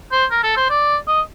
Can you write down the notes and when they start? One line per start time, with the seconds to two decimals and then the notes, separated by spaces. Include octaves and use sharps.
0.12 C5
0.31 A#4
0.43 A4
0.56 C5
0.70 D5
1.08 D#5